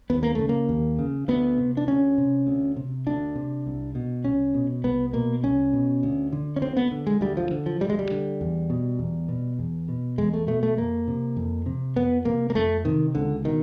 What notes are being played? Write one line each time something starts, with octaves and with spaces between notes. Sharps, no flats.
D#2 B3
A#3
C#3 A3
A#3
D#2
C#3
D2 B3
C3
D4
D2 C#4
C3
D2
C3
D2 D4
C3
C2
B2
C2 C#4
B2
C2 B3
B2 A#3
C2 C#4
B2
D2
D3
C#4
D2 C4
B3
D3
G#3
D2 G3
F3
D3
F3
D2 G3
G#3
G3
D3
E2
B2
E2
B2
E2
B2
E2 G#3
A3
B2 A3
A3
F2 A#3
C3
F2
C3
F2 B3
C3 A#3
A#3
F2 A3
C3 D#3
C#2 D3
B2 D#3